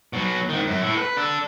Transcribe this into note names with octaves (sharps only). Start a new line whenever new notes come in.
B2 F#3
G#2 D#3
F#2
A2 E4
A4 B4
D4 A4